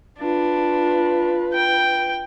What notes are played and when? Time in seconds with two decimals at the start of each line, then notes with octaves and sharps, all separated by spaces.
0.20 D4 F4 B4
1.54 G5